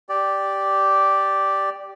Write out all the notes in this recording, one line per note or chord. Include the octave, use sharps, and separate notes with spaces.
G4 D5